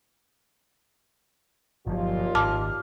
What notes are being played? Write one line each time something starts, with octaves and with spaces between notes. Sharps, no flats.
G1 D#2 A#2 F3 F#3 F4
G#1 A5 D6 F6